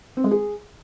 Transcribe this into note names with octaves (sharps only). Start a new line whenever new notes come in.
C4
G#3
G#4